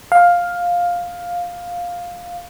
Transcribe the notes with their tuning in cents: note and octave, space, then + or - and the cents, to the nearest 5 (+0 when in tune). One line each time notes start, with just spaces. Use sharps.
F5 +10